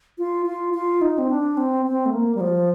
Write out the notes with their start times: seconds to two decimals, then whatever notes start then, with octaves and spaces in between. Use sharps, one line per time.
0.18 F4
0.46 F4
0.74 F4
1.01 D#4
1.18 C4
1.30 D4
1.57 C4
1.86 C4
2.06 A3
2.13 A#3
2.35 G3
2.41 F3